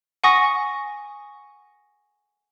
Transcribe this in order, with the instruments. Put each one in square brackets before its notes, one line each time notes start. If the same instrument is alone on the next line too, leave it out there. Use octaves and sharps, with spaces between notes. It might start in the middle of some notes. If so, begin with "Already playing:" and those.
[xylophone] F#5 G#5 C#6 D#6 A#6